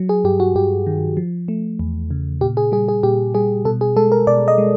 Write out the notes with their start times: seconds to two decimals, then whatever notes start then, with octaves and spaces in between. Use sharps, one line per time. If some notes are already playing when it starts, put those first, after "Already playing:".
Already playing: F#3
0.09 G#4
0.24 G2 G4
0.40 F#4
0.55 G2 G4
0.87 D#3
1.17 F3
1.48 A3
1.79 E2
2.11 C#3
2.41 A#2 G4
2.57 G#4
2.72 G3 G#4
2.88 G#4
3.03 A#2 G4
3.35 G3 G#4
3.65 B2 A4
3.81 G#4
3.96 G#3 A4
4.12 A#4
4.27 B2 D5
4.48 D#5
4.58 G#3